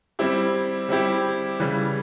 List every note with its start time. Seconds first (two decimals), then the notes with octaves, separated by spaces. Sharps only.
0.19 G3 C4 E4 G4
0.89 G3 C4 E4 G4
1.59 C#3 E3 G3